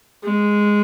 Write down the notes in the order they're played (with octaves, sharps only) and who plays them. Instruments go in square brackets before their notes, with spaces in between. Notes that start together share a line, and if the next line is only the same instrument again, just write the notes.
[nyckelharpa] G#3